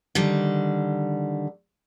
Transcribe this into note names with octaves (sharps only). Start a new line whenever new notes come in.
D3 D#3 G3